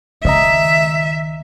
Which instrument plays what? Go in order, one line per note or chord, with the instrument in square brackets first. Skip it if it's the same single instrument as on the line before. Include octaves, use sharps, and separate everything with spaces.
[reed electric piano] C#2 D#5 A#5 [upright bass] D#3 [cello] E5